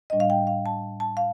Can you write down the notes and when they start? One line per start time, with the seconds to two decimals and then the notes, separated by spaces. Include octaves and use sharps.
0.10 A2 G3 D4 D#5
0.20 F5
0.30 G5
0.47 F5
0.66 A5
1.00 A5
1.17 F5